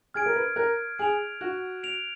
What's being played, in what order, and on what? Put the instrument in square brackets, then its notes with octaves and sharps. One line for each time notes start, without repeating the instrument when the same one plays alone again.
[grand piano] G#4 [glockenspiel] F6 G#6 D7
[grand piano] A#4
B4
[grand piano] A#4 [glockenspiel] F#6
[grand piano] G#4 [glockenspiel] D7 F7
[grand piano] F#4 [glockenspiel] F#6
[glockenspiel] D7 F7